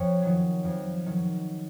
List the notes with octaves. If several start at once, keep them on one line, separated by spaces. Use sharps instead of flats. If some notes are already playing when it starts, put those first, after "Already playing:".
Already playing: F2 C#5
D#3 F#3
F2
D#3 F#3